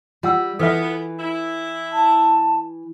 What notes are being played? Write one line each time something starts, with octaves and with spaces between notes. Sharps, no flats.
G3 F4 F#5 E6
E3 B3 A4 B4 E5
E4
A5